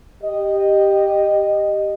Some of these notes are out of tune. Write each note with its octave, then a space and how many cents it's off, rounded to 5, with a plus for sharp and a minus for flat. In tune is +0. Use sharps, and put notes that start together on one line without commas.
G4 +0 D#5 -15